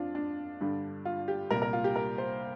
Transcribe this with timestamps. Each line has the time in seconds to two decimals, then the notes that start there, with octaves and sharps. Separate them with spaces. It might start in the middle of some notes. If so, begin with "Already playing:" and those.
Already playing: F2 F3 D4 F4
0.15 D4
0.60 G2 D3 G3
1.05 F4
1.28 G4
1.50 C2 A#2 G3 A#4
1.62 A#4
1.73 F4
1.84 G4
1.96 A#4
2.18 C5